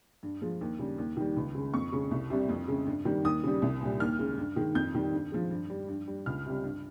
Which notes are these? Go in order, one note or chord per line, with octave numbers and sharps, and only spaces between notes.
G2
F3 G#3
D#2
C#3 G3
D#2
D#3 G3
C#2
C#3 G#3
F2 C#6
C#3 G#3
C2
C3 G3
F2
C#3 G#3
G2
D#3 G3
D#2 D#6
C#3 G3
C2
A#2 G3
D#2 F6
C#3 G#3
G2
D#3 G#3
F2 G6
D#3 G3
G2
F3 G#3
G2
G3
G2
G3
C#2 F6
C3 G3
G2